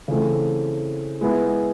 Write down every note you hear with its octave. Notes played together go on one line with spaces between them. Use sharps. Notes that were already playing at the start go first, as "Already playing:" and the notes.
C#3 E3 A3 C4
G#3 B3 E4